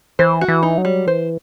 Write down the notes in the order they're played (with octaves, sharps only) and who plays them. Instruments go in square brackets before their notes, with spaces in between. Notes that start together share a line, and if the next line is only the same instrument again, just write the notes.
[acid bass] E3 [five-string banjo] C5
[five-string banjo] F#4
[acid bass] E3
[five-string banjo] D#4
[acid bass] F#3
[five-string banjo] G3
[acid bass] E3 [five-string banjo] C5